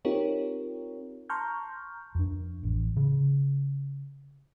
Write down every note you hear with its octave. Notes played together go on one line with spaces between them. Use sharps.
C4 D#4 F4 G4 A#4 C#5
A5 A#5 C6 C#6 F6 G6
F2 D4
A1
C#3